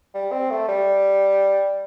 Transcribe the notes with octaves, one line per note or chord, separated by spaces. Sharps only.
G3
C4
A3
G3